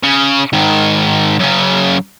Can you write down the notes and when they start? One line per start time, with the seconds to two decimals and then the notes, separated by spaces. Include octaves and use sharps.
0.03 C#3
0.53 G#2 D#3
1.40 F#2 C#3